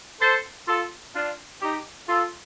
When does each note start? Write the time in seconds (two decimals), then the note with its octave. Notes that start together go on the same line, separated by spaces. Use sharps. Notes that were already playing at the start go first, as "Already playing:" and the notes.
0.21 A4 C5
0.68 F4 A4
1.15 D4 F4
1.62 D#4 G4
2.09 F4 A4